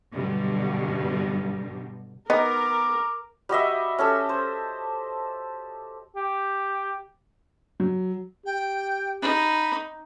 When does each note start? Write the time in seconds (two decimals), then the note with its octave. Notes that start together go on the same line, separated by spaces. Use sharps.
0.14 G2 B2 D3 F#3 G3
2.30 B3 D#4 A#4 D6
3.49 G3 F#4 D#5 E5
3.99 C#4 G4 A4
4.29 C5
6.16 G4
7.80 F#3
8.45 G4 G5
9.22 D#4 B5